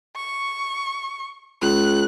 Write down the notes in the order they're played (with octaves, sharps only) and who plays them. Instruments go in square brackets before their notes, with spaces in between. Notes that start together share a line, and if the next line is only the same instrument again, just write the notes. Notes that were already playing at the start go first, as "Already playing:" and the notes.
[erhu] C#6
[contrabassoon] C#2 [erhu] F#6